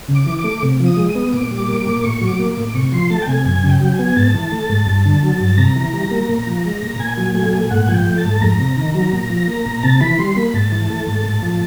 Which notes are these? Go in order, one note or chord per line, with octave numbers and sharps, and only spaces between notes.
C#3
D6
E3
D6
A3
C3
F3
D#6
G#3
D#6
B3
A#2 D6
G3
D6
A#3
D6
A#2
A2 C#6
F#3
D6
A#3
D6
A2
C3 C#6
F3 C6
A3 A5
G5
C3 G#5
F#2 G#5
C#3
G5
F#3
G#5
B3
G#2 A5
E3
A3
G#2
G2
D3
F#3
G2
C3 A#5
E3
G3
A#3
A#2
F3
G#3
A#2
A#2 G#5
F#3 G#5
A3 G#5
A#2 G#5
G#2 F#5
F3 G#5
G5
A3
A5
G#2
F2 A#5
C3
D#3
F#3
A#2
F3
A#3
A#2
C3 A5
E3 B5
G3 C6
A#3 B5
G#2 A5
E3
A3
G#2
A2
F3